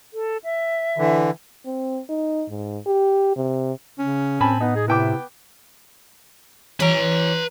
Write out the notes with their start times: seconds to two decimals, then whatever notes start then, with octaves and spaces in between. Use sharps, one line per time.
0.14 A4
0.44 E5
0.98 D3 E3
1.65 C4
2.09 D#4
2.50 G#2
2.86 G4
3.36 C3
3.98 C#3 C#4
4.40 A2 C4 G#5 A5 B5
4.60 B3 D#4
4.76 G#4
4.88 C3 B3 E4 G5 D6
6.80 E3 B4 C#5 A#5